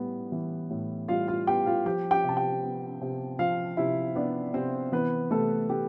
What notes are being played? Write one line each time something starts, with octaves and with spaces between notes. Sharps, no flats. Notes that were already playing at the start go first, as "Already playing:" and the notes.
Already playing: A2 G3 B3
E3
A2
G3 F4 F5
F4 F5
B3 G4 G5
F4 F5
F3 G4 G5
G4 G5
C3 A5
G4 G5
B3
C3
F3 F4 F5
C3 E4 E5
B3 D4 D5
C3 C4 C5
E3 B3 B4
C3 A3 A4
A3 G4